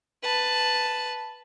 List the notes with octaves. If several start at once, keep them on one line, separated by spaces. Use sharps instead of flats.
B4 A5